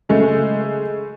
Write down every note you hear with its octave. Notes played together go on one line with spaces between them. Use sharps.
C#3 G#3 A3